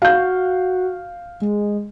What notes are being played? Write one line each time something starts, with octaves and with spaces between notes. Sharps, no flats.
F#4 F5 G6
G#3